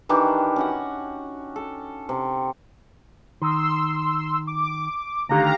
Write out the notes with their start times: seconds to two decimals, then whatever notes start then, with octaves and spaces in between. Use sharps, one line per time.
0.09 D#3 E3 D4 G4
0.56 C#4 F#4 F#5
1.56 A4
2.09 C3
3.42 D#3 C6 E6
4.47 D6
5.29 D2 D3 D#3 G4 F5 A#5